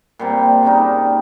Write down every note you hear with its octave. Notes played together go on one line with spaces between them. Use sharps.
A#2 G3 C4
C#3 G3 A#3 D#4